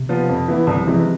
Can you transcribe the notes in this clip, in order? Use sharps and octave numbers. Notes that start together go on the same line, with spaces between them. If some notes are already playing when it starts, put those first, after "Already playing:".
Already playing: C3
F3 B3 F4
F2
E3 B3 E4
C2
F3
C3 E3 G#3
F3